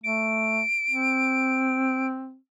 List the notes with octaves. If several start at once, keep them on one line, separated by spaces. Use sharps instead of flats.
A3 D7
C4